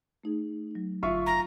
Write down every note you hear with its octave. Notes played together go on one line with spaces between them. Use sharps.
A3 D#4 G#4
F#3 D#4
G1 F4 E5 C#6
F#1 A#5